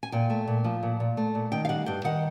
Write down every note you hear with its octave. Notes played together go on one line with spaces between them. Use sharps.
G#5
A#2 G5
A3
A#2
F3
A#2
A#2
A3
A#2
D#3 G5
F5
G3 F#5
G2 G5
D#3 F#5